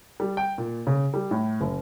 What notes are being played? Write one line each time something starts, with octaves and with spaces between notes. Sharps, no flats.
G3
G5
A#2
C#3
G3
A2
F#1